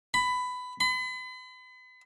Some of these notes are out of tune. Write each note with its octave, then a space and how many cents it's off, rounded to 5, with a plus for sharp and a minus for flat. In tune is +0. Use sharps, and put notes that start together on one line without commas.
B5 +15
B5 +40